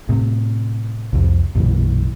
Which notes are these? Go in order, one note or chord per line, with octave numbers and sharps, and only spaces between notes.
A2 C3
C2 F2
B1 F#2 A#2 E3